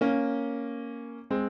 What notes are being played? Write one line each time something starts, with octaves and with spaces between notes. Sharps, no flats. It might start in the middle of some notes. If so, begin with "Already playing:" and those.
A#3 C#4
G#3 C4